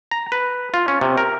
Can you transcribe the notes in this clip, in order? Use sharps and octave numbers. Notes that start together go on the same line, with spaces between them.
A#5
B4
F4
C#4
C3
A#4